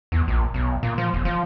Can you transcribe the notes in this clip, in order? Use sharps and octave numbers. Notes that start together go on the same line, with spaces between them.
E2
A#1
B1
A#2
F3
E1
F3